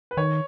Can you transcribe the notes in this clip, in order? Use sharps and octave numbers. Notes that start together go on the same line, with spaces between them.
B4
D#3 C#5